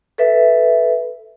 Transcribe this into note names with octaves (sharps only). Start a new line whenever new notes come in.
A4 B4 E5